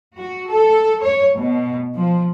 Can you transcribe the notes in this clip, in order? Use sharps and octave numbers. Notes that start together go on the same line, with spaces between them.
F#4
A4
C#5
B2
F3